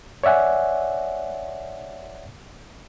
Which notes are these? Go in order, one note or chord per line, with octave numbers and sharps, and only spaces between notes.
C#5 D5 E5 F#5 G#5